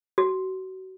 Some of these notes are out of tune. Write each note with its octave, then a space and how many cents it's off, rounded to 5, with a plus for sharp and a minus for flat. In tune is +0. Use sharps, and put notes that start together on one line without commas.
F#4 +30